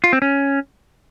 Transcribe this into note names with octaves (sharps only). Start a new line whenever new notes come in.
F4
C4
C#4